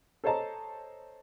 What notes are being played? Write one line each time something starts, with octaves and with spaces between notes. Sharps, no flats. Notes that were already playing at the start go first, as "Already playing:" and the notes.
A4 C5 C#5 D#5 A5 A#5